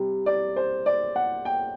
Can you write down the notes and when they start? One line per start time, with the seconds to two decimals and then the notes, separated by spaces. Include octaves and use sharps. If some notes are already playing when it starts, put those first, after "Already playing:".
Already playing: C3 G3
0.26 D5
0.56 C5
0.86 D5
1.16 F#5
1.45 G5